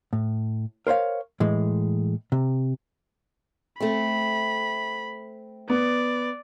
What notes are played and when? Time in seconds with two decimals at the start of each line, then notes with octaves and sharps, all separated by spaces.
0.13 A2
0.87 A#4 C5 C#5 F5
1.40 A2 E3 G#3
2.32 C3
3.81 A3 C4 B5
5.70 B3 D5